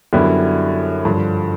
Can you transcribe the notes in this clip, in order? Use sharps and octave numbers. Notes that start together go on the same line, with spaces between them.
F#2 D3 G3 B3 E4
G2 D3 F3